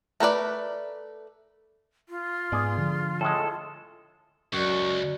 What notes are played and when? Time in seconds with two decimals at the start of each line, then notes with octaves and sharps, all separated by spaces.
0.20 A3 A#4 B4 D5
2.09 F4
2.52 G#2 B3 G#4 D5
2.78 D3 F3
3.21 A2 G#3 A4
4.53 C#2 F#2 F#4 D5 C#6